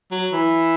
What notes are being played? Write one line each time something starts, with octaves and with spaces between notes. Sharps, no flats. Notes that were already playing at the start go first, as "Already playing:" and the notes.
F#3
E3